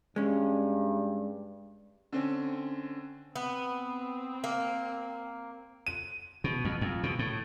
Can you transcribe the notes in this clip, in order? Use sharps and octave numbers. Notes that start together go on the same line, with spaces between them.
G2 G#3 C#4
D3 C4 C#4
B3 C4
A#3
D#7
B2
F2
F2
B2
A2